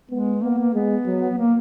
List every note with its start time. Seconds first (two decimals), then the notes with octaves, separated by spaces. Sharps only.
0.10 G#3 B3
0.42 A#3 B3
0.58 A#3
0.73 G#3 B3
1.06 F#3
1.38 A#3